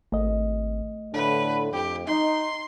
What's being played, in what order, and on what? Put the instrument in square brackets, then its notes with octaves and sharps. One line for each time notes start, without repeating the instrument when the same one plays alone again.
[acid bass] G#1 [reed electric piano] A3 D#5
[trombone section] A2 D3 [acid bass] D4 [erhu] B4
[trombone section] F2 [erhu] G4
[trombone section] D#4 [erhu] C6